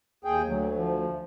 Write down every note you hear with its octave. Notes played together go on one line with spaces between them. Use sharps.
D#2 G#4 G5
D2 F#3
F3